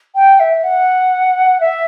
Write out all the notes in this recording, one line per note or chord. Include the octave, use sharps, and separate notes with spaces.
G5
E5
F#5
E5